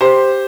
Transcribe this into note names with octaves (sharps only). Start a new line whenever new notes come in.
G4 C5